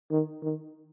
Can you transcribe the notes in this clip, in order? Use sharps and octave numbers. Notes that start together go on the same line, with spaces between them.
D#3
D#3